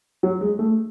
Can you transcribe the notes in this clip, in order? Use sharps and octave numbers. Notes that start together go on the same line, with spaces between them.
F#3
G#3
A3